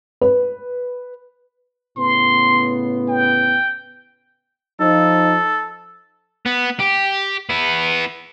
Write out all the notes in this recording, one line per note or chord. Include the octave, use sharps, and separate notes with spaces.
B4
A2 C#3 B3 C6
G5
F3 D#4 A4
B3
G4
B3 E4